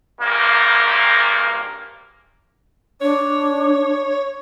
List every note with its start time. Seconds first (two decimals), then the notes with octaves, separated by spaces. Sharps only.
0.20 G#1 G2 A#3
3.02 D4 C#5